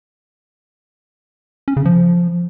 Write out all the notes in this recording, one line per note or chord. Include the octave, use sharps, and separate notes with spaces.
C#4
C#3
F3